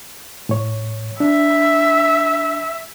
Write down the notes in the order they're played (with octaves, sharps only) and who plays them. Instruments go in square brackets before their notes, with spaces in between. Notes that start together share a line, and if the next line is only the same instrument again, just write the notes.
[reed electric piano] A2 C#5
[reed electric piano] D4 [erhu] E5